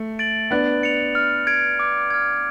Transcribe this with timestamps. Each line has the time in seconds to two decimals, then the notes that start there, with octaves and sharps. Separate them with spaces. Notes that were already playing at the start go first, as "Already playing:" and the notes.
Already playing: A3
0.19 A6 D7 F#7
0.51 B3 D4 F#6
0.83 C#7 F7
1.15 F6
1.47 G#6 D7
1.79 D6
2.10 F6 G#6